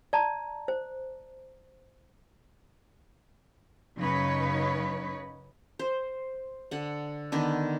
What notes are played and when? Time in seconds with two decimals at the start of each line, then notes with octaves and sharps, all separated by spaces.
0.13 D5 A5 A#5
0.68 C5
3.97 F#2 C#3 F#3 D#4 B4 C#5
5.79 C5
6.71 D3 F#5
7.32 D3 D#3 B3 D4